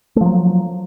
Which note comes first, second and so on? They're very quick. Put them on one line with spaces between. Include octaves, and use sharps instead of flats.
A3 F3 F#3